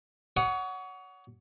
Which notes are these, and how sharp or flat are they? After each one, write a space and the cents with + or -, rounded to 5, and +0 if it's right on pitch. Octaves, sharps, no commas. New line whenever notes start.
C#5 +30 F#5 +0 D#6 +0